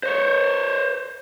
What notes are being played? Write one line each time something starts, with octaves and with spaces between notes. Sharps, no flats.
C5 C#5